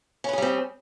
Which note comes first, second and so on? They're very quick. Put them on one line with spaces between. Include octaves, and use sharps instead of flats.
C#4 B4 G#4 G3 C4